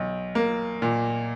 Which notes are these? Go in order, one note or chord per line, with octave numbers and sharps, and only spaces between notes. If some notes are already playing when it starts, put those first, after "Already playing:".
Already playing: B1
A#3
A#2